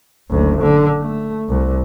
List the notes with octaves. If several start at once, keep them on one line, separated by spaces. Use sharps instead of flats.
F#1 D2
D3
A3
C2